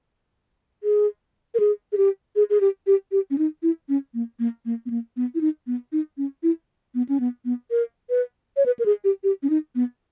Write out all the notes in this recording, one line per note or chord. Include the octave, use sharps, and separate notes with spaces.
G#4
A#4
G#4
G#4
G4
G#4
G#4
G4
G4
G4
C#4
D#4
E4
C#4
A#3
A#3
A#3
B3
A#3
B3
E4
D#4
B3
D#4
C#4
E4
B3
C#4
B3
B3
A#4
B4
C#5
B4
A#4
G#4
G4
G4
C#4
D#4
B3